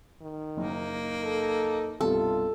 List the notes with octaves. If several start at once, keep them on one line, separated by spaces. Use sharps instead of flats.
D#3
F#1 A#3 D#4
A4
C2 G2 B2 F4 A4